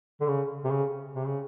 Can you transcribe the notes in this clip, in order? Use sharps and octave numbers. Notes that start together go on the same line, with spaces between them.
D3
C#3
C3
C#3
C3
C#3